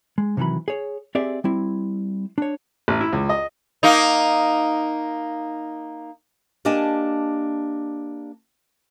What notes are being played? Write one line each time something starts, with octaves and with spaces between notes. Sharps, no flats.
G#3
C3 D#3 E3 F#3 B5
G#4 C#5
C4 G4 G#4 D5 E5
G3 C4 E4
D4 C#5
A1
E4
C#2
D#5
A#3 D#4
A#3 D4 G4 D#5 G#5 A5